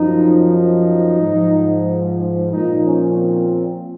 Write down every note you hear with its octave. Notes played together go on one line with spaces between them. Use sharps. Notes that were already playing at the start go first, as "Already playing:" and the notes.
Already playing: F#2 F3 D#4
D#4
G#2 F3
A#2 F3 D#4
C#4
C4